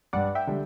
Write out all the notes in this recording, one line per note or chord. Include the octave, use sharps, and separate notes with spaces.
G2 D5 F#5
E5 G5
D3 G3